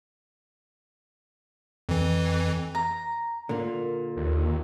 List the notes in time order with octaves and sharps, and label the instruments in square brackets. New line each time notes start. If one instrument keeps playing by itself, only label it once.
[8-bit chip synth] F2 E3
[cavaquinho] A#5
[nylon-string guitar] A#2 [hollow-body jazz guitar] D3 A#3
[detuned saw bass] D#2